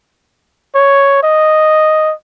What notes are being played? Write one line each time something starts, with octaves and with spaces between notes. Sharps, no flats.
C#5
D#5